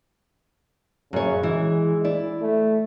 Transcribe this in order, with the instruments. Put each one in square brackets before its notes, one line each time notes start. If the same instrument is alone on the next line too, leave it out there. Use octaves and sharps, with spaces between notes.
[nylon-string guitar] F#2 C#5 [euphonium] C#3
[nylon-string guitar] E3 [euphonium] G#3
[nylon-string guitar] E4 D5
[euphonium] A3